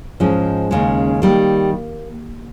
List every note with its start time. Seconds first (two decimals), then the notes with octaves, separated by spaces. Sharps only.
0.20 G#2 F3 G#3 C#4
0.71 D#2 C#3 G#3
1.22 D#3 G3 A#3